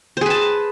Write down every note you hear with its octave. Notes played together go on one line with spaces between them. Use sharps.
G#4 B4 C5 A5